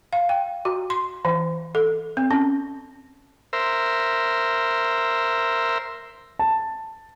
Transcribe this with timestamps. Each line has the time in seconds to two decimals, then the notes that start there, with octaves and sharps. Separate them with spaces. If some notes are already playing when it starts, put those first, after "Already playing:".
0.13 F5
0.29 G5
0.65 F#4
0.90 C6
1.25 E3
1.75 A4
2.17 C4
2.31 C#4
3.53 A#4 C5 E5
6.39 A5